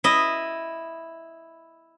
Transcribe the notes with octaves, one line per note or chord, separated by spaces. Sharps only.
E4 D#5